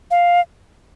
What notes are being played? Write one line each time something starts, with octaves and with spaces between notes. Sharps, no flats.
F5